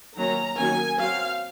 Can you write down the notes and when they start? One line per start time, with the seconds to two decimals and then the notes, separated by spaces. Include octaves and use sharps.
0.16 D#3 F#3 A#3 C#4 A#5
0.58 D#3 F#3 A#3 C#4 G#5
0.99 F#3 C4 F5